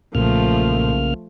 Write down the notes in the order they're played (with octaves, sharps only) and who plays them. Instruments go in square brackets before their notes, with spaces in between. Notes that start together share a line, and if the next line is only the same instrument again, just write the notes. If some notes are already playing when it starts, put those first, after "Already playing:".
[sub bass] B1 [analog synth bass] A#2 [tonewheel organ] C#3 A#3 F6 [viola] F3 A3